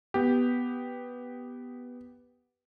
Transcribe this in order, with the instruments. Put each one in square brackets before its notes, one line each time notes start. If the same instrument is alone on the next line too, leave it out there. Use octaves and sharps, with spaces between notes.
[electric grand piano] B3 G4